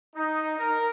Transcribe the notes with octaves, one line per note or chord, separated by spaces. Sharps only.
D#4
A#4